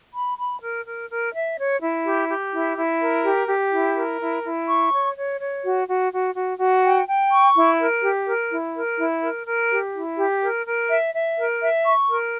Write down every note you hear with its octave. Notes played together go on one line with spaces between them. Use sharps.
B5
B5
A#4
A#4
A#4
E5
C#5
E4
G4
G4
E4
E4
A#4
G4
G4
E4
A#4
E4
E4
C#6
C#5
C#5
C#5
F#4
F#4
F#4
F#4
F#4
G5
G5
C#6
E4
A#4
G4
A#4
E4
A#4
E4
A#4
A#4
G4
E4
G4
A#4
A#4
E5
E5
A#4
E5
C#6
A#4